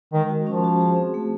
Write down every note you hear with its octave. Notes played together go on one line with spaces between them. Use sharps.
D#3 G#3
F#4
F3 C#4
F#4
G#4
C4
A3